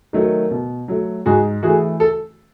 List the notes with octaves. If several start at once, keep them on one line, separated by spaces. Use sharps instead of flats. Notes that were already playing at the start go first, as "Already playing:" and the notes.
D#3 F#3 A3
B2
F#3 A3
G#2 F#4 G#4
E3 A3 F#4 G#4
A4